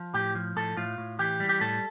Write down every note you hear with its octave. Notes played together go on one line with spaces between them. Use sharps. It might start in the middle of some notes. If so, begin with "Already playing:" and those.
Already playing: F3
A2 G4
F3
A2 A4
A2 F4
A2
E3 G4
G3
G4
A2 A4